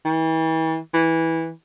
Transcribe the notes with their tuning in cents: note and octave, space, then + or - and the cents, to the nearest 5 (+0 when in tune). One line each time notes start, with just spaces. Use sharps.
E3 -35
E3 -15